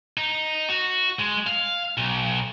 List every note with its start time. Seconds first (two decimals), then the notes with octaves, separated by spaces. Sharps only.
0.18 D#4
0.69 F#4
1.19 G#3
1.47 F5
1.97 B1